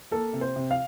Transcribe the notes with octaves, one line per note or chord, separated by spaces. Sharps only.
A#3 A4
C3
C5
C3
F5